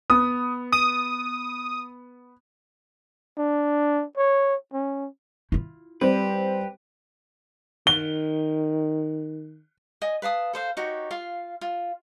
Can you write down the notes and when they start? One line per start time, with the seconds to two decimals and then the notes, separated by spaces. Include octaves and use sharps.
0.10 B3 D#6
0.72 D#6 D#7
3.38 D4
4.17 C#5
4.73 C#4
5.52 E4 F4
6.01 G3 C4 G4 B4
7.87 D#3 G7
10.02 D#5 G#5
10.22 B4 F5 A5 D#6
10.53 A4 C5 F5
10.77 D#4 F#4 G4 C#5
11.11 F4 F5
11.61 F4